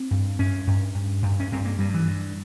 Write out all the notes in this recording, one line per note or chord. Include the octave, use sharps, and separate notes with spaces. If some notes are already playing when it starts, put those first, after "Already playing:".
Already playing: C4
G2
G2 C#4
G2
G2
G2
C#4
G2 C4
A#3
G2 G3
E3
G2